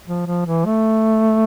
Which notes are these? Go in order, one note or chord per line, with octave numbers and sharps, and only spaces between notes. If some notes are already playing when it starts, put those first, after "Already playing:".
F3
F3
E3
A3